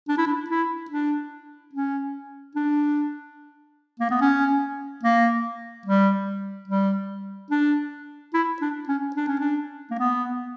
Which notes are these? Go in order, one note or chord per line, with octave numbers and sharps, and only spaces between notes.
D4
E4
D4
E4
D4
C#4
D4
A#3
B3
C#4
A#3
G3
G3
D4
E4
D4
C#4
D4
C#4
D4
A#3
B3